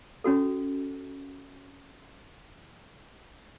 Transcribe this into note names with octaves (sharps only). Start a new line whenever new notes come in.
C#4 F#4 A4